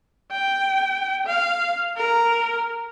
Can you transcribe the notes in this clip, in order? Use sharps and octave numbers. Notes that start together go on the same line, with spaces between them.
G5
F5
A#4